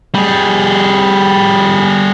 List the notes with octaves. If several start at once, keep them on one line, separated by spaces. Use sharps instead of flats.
G3 G#4